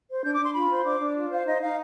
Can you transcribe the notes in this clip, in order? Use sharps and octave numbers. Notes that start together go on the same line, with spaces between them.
C5
D4 G6
D6
D4 C6
F4 B5
C5
C6
D4 D6
D4
F4
C5 F5
D#4 D#5
D#4 F5